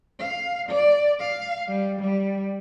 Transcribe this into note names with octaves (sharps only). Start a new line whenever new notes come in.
F5
D5
F5
G3
G3